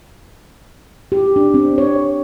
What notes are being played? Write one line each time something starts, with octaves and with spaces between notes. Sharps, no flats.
G4
D4
C4
C#5